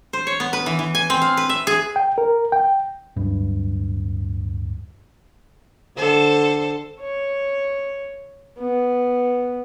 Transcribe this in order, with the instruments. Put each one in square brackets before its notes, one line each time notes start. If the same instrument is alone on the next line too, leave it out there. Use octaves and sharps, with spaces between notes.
[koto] C5
C#5
B3
B4
E3
E3
G#5
C4
F5
B4
E5
G#4
[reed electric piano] G5
A#4
G5
[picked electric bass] D1 G2
[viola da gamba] D3 A4 C5
[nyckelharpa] C#5
B3